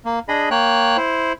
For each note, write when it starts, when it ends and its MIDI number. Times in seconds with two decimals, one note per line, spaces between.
0.05 0.19 58
0.28 0.49 62
0.28 0.49 68
0.28 0.49 75
0.28 0.49 83
0.51 0.97 58
0.51 0.97 73
0.51 0.97 79
0.51 0.97 90
0.97 1.33 64
0.97 1.33 72